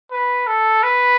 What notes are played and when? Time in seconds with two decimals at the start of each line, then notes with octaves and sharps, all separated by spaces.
0.11 B4
0.47 A4
0.83 B4